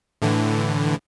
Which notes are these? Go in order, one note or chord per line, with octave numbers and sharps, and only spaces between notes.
A2 D3 E3